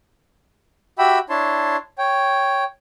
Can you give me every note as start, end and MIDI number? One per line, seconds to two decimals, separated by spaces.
0.99 1.19 66
0.99 1.19 67
0.99 1.19 76
0.99 1.19 79
0.99 1.19 83
0.99 1.19 88
1.30 1.77 62
1.30 1.77 64
1.30 1.77 73
1.30 1.77 81
1.30 1.77 84
1.98 2.64 73
1.98 2.64 79